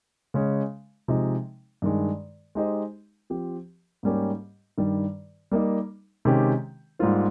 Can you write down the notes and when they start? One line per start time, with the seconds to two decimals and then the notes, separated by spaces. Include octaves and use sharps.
0.34 C#3 G#3 C#4
1.08 C3 F3 G#3 D#4
1.82 G2 D#3 G#3
2.55 G#3 D#4 G4 C5 D#5
3.30 F3 C4 G4
4.03 G#2 G3 A#3 C#4 G4
4.78 G2 D#3 G3
5.51 G3 A#3 D#4
6.25 C3 D#3 G#3 C#4 G4
6.99 G#2 G3 A#3 F4 C5